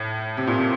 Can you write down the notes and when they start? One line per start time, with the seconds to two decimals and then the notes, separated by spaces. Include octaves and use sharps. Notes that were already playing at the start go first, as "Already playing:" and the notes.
Already playing: A2
0.37 C3
0.47 A#2
0.59 C3